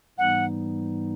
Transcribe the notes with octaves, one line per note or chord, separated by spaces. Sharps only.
G#2 E3 G3 B3 D#4 F#5